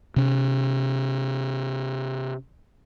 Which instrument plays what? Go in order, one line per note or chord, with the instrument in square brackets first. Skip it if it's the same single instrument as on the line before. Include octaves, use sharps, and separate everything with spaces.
[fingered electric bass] C3 C#4